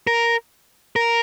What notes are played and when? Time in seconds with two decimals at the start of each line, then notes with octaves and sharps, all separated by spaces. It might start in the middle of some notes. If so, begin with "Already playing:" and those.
0.07 A#4
0.96 A#4